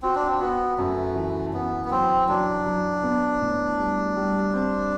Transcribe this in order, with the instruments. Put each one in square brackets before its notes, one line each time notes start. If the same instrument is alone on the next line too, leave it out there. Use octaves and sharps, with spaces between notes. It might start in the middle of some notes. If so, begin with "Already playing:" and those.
[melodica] C4 [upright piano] F#4
[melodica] D4
C4
[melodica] B3 [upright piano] F#4
[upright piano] F#2 [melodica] A3
[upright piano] E3
[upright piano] F#2 [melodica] B3
[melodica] B3
[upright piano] F#3 [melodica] C4
[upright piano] F#3 [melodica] D4
[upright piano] F#3
B3
A2
G3
G3
C4